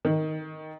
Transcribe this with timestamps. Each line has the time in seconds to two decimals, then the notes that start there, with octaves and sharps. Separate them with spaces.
0.05 D#3